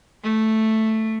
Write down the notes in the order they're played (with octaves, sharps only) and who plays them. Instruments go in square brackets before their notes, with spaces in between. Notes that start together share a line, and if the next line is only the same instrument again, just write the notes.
[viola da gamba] A3